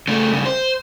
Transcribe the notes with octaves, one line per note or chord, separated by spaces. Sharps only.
C#3 A3
G2 C#3
C5